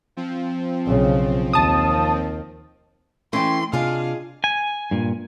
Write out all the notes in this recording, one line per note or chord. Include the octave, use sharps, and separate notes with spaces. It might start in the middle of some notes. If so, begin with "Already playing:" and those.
F3 C4
B1 C#3
D#2 D#3 A5 D#6
E3 A3 C#4 G5 C6
C3 D4 F4 G#4 D#5 F5
G#5
G2 A#2